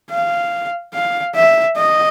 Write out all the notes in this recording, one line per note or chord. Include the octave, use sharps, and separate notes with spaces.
F5
F5
E5
D#5